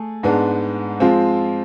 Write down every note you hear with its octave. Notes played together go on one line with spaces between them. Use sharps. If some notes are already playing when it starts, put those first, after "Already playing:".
Already playing: A3 G#4
G#2 G#3 B3 D4
F3 G#3 C4 F4